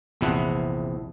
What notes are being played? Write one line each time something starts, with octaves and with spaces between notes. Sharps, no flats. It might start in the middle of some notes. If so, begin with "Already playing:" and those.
A#1 E2 C3 F3 E4 F#5